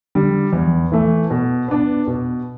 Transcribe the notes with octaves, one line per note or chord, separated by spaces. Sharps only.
D3 G3
E2
E3 A3
B2
B3 D4
B2